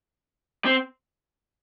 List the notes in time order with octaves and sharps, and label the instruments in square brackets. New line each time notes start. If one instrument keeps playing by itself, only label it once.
[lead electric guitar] C4